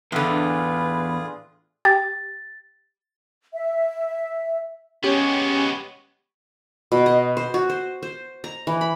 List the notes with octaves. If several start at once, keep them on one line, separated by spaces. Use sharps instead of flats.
E2 A2 D3 F4 G#4 B4
G4 A6
E5
G#3 B3 C#4 G4 C#5
B2
D#5
C5
F#4
C5
C5
A#5
E3
B5